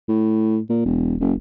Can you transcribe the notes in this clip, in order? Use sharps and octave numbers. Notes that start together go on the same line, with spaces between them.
A2
A#2
E1
F#1